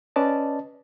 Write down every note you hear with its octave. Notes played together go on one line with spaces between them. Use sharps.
C#4 B4 D5 D#5 A5